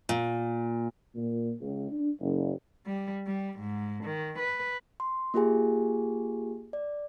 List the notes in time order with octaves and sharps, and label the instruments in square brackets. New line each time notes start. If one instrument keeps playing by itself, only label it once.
[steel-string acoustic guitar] A#2
[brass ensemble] A#2
C#2
D4
F#1
[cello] G3
G3
G#2
D#3
B4
[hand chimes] C6
A#3 F4 G4 G#4 G#5
D5